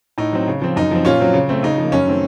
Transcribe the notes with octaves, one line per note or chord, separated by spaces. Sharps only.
A2 D#4
F#3 C4
C#3
F3 C4
F#2 D#4
F3 C4
A#2 C#4 F4
F#3 C4
C#3
A3 C4
C#3 D#4
F3 A#3
F#2 C#4
D#3 A3 C4